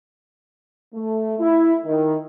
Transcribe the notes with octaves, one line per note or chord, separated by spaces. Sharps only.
A3
E4
D#3